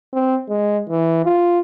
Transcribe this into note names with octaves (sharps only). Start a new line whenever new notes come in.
C4
G#3
E3
F4